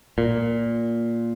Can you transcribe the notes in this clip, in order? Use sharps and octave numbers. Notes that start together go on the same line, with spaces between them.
A#2